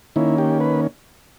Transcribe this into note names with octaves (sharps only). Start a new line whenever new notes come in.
D#3 A#3 C#4 E4
G4
B4